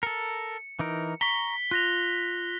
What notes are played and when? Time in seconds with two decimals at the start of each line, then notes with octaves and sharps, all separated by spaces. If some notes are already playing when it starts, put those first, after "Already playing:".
0.03 A4 A#4 C#7
0.79 E3 D#4 A#4
1.21 A#5 C#6 B6 G7
1.71 F4 F#6 A#6 F7